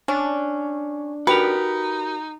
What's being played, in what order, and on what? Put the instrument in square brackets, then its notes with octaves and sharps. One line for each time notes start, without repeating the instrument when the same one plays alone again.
[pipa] C#4 [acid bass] D4
[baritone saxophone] D#4 [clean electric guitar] F#4 G4 A#4 [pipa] B4